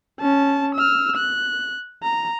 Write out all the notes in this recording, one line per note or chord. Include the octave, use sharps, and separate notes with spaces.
C#4 A5
E6 F6
F#6
A#5